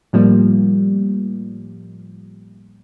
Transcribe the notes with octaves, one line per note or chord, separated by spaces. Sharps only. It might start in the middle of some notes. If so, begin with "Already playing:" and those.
A2 F3 G3 A#3